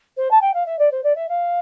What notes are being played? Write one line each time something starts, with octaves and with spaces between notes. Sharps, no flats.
C5
A5
G5
F5
E5
D5
C5
D5
E5
F5